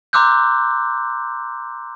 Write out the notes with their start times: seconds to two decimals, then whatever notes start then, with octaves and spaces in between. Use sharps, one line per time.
0.13 A#5 C6 D6 E6 F#6 G6